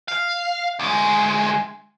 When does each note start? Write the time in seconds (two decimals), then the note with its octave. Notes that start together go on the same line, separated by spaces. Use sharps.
0.08 F5
0.79 D2 G#3